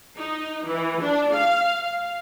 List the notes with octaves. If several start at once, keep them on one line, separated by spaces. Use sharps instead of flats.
D#4
E3
D4
F5
F5